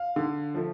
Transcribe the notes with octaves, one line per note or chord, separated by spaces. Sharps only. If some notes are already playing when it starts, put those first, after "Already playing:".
Already playing: F5
D3
F3 A3